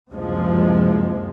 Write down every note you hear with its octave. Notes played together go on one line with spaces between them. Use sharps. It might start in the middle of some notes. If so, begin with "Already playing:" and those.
F#1 D2 G2 C3 F3 G#3